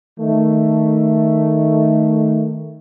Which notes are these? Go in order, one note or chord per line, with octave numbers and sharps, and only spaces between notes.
D#3 A3